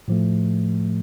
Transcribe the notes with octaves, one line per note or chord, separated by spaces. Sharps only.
A2 F3 A3